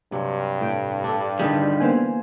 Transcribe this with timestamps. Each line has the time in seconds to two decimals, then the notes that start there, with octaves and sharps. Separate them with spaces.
0.12 G2 C3 F#3
0.60 A2 G5
1.04 D4 A4
1.40 D3 D#3 G3 G#4 A4 B4
1.80 E3 A#3 B3 C5 F5 G#5